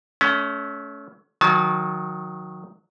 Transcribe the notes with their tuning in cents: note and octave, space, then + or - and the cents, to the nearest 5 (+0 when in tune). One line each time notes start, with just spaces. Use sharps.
A3 -20 C#4 +20
D#3 +0 F#3 -20 A5 -40